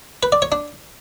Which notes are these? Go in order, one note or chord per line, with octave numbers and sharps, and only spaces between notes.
B4
D5
C#5
D4